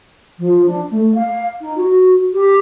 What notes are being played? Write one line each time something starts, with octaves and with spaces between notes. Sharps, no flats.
F3
D4
A3
F5
D#4
F#4
G4